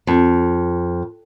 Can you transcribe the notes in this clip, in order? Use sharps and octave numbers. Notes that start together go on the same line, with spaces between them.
F2